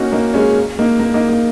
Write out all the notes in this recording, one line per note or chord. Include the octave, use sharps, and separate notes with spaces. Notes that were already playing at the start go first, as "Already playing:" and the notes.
Already playing: A#3 C#4 D#4 F#4
A#3 D#4
G#3 C#4
A#3 D#4
A#3
A#3 D#4
A#3